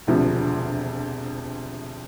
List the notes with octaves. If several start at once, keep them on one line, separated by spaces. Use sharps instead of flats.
E1 D2 C3 F3